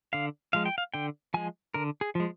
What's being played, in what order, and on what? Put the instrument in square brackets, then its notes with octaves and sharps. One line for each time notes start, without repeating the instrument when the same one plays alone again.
[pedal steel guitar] D3 F5
F3 G#3 F5
G5
F5
D3 G5
F3 G#3 G#5
D3 A#4
G#4
F3 G#3